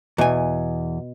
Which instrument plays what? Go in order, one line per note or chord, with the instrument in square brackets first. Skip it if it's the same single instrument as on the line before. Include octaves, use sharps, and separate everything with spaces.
[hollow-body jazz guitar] E2 G#5 [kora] B2